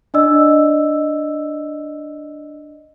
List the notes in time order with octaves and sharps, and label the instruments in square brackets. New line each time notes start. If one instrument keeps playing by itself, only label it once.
[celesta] D4 D5 D#5 E6